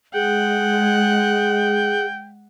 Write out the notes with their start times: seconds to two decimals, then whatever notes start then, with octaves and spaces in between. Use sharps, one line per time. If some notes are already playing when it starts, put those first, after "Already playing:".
0.14 G#3 G#4 F#5 G5